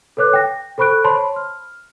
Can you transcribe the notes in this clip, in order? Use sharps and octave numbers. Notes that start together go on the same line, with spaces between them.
A4 B4 C#5 D6 F#6
G5 A#6
A4 C5 B5 C#6 F#6 D7
C5 C#5 A5 B5 C6
F6